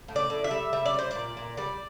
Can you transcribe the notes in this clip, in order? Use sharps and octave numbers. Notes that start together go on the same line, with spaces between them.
A2
D5
A2
E5
G3
G3 E5
D5
G3 C5
A#2 D5
A#2
G3 D5